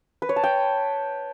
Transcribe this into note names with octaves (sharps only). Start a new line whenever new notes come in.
B4
C#5
A5
G5